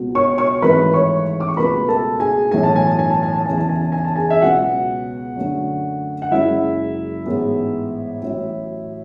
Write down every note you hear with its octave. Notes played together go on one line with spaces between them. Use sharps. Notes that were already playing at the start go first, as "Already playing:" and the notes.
Already playing: C#2 B2 F#3 B3
C#5 C#6
C#5 C#6
G#1 G#2 E3 A3 B4 B5
C#5 C#6
D6
C#6
C#2 B2 A3 B4 B5
A4 A5
G#4 G#5
B1 A2 E3 A3 G#5
A5
G#5
A5
G#5
A5
G#5
A5
E2 C#3 E3 G#5
A5
G#5
A5
G#5
A5
G#4 G#5
E5
C#2 B2 F#3 B3 F#4 F#5
F#2 D3 A3
F#5
F#1 F#2 C#3 G#3 E4 E5
A1 G#2 G#3 B3
A1 A2 F#3